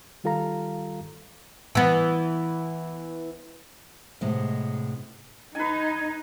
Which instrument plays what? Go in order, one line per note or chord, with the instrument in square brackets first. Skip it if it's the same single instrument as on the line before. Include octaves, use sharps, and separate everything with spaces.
[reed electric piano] D#3 G3 F4 A4 F5 A#5
[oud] E3 B3
[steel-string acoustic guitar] A2 C3 G#3 B3 D#5
[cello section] D#4 [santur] B4 G#5